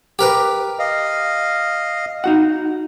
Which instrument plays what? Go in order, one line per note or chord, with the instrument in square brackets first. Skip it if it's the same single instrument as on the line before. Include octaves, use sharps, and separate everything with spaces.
[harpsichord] G4 A#4 B4
[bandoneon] D#5 F5
[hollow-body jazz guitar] D#4 F#4 F#5